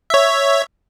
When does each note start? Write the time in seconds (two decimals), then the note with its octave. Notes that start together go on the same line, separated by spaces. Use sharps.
0.10 C#5 E5